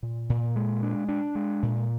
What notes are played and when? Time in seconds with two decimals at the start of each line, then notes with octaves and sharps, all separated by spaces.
0.03 A#2
0.30 A#2
0.56 G#3
0.83 D4
1.09 D4
1.35 G#3
1.63 A#2